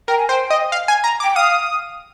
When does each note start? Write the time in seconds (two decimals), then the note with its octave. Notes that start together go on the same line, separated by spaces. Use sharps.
0.08 A#4 G5
0.18 G#5
0.28 C5 G5
0.50 D#5
0.72 F5
0.88 G#5
1.04 A#5
1.20 D6
1.24 G5
1.36 F5 D#6